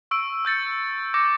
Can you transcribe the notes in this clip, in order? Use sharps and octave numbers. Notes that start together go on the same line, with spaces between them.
C#6 E6 D7
E6 G6 A6 C#7
D6 G6 A#6 C#7